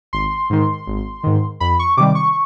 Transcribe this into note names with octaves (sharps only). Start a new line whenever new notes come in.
G#1 C6
G#2 D#3
G#1
G#2 D#3
F2 B5
C#6
C3 D#3 G3 D6
C#6